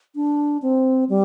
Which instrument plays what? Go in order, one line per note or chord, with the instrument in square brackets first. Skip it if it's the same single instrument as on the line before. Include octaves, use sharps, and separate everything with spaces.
[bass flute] D4
C4
G3